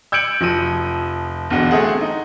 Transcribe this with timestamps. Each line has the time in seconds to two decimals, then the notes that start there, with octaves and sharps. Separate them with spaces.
0.12 E6 G6 G#6 C#7 D7 F#7
0.41 F1 F3 E6 D7 D#7
1.50 E1 B1 D3 F#5
1.71 A3 C4 G#4 F#5
2.01 D#4